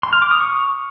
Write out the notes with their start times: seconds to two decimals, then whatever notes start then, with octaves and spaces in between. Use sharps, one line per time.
0.03 C6
0.13 F6
0.22 D6
0.31 D#6
0.40 C#6